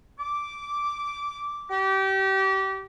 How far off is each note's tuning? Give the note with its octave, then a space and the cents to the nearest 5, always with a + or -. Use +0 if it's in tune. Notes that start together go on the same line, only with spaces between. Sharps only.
D6 -10
G4 -30